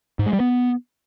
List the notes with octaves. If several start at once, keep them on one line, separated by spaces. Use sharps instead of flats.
G#2
G#3
G3
B3